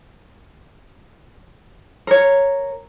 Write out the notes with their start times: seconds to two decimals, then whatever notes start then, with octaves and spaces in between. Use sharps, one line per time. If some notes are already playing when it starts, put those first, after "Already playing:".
2.07 A#4 C#5